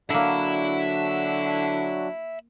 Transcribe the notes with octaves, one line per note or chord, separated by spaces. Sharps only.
D3 F#3 A#3 D4 E4 F#4 E5 B5